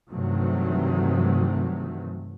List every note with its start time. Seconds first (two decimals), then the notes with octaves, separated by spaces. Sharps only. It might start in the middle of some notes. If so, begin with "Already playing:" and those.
0.11 G2 C3 D#3 E3 F#3 A3